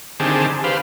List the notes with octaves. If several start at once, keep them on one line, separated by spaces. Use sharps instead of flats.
D3 D#3 C4 G4 G#4 A5
G4 B4 C5 F5